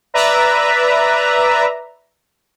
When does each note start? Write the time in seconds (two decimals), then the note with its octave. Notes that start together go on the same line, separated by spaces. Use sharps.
0.14 B4 D5 E5 A#5